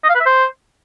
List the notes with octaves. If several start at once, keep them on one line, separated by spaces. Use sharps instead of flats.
D#5
F5
B4
E5
C5